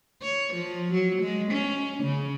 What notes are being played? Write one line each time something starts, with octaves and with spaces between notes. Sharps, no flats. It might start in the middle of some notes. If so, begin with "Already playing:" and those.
C#5
F3
F#3
G#3
C#4
C#3